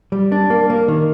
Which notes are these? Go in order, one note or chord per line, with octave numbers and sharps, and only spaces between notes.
G3
D4
A#3
A#3
D#3